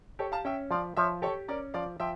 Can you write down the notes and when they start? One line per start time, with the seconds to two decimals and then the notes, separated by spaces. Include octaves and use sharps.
0.19 G4 A4 C#5
0.32 F5 A5
0.45 C#4 E5 G5
0.71 F3 D5 F5
0.97 F3 C#5 E5
1.22 G4 A4 C#5
1.48 C#4 A#4 D5
1.74 F3 D5 F5
2.00 F3 E5 G5